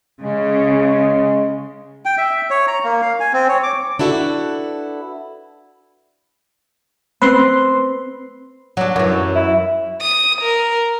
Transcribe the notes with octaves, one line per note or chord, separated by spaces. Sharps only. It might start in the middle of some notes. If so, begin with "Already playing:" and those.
C#3 G#3
G5
E5
C#5
A#5
A#3
F5
G#5
C4
C#5
D6
D4 E4 F#4 A4 B4
C4 B4 C6
F#3 D4
F#2 E3
E4
D#6
A#4